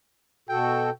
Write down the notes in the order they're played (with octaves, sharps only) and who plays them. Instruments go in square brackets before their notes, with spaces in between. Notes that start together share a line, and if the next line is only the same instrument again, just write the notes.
[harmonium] B2 F#4 A4 [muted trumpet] G5